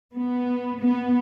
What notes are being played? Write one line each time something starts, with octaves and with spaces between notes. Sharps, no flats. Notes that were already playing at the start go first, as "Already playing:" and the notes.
B3
B3